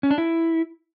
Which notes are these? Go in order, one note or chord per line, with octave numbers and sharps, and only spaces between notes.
C#4
D4
E4